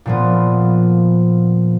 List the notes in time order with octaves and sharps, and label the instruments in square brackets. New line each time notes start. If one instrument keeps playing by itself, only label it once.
[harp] A#2 F3 B3